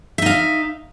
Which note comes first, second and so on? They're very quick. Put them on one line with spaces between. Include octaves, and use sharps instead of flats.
E5 D#4 F5